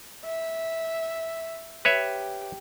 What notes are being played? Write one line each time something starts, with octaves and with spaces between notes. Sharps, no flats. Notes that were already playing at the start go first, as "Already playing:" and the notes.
E5
G4 B4 C#5 E5